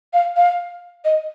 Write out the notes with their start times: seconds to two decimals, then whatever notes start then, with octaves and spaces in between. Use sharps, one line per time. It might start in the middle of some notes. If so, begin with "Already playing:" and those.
0.13 F5
0.37 F5
1.05 D#5